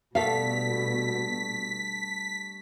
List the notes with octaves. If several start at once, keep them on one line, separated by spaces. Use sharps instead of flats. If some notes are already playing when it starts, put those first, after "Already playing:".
G2 B2 A3 A4 F5 F#5 B6